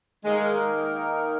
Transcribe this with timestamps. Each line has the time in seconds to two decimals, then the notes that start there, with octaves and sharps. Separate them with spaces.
0.25 D#3 G#3 A#3 D#4 A#4